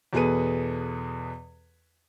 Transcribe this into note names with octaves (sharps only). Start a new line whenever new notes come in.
E2 B2 G#4 A4 B4 D#7